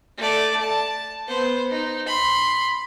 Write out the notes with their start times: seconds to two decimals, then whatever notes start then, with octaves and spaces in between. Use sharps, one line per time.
0.18 A3 D5
0.61 A5
1.28 B3 C5
1.71 D#4
2.07 B5 C6